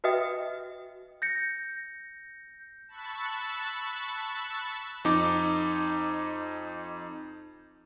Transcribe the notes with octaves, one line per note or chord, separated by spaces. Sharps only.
F#4 B4 D#5 E5 G5 D#6
G6 A#6 C#7
A5 B5 C#6 E6 F#6 A6
F2 D#4 D6